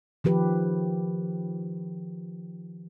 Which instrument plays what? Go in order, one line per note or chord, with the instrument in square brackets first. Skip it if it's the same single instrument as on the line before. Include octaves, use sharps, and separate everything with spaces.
[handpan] D#3 F3 G4 B4